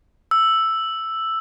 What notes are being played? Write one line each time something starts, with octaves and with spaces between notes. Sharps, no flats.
E6